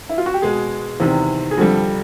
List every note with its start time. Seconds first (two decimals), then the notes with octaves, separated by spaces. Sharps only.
0.09 E4
0.18 F4
0.26 F#4
0.34 G4
0.42 B2 G#3 G#4
1.00 E2 C3 D#3
1.51 G#4
1.57 F2 D3 G3 A4